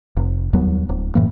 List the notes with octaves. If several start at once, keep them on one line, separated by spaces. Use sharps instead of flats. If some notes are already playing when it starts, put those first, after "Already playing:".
F1
D#2 F#3 G3 B3
D1
F#2 A2 E3 A#3